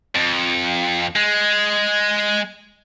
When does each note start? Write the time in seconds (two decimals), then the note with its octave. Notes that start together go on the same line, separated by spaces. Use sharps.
0.15 F2
1.16 G#3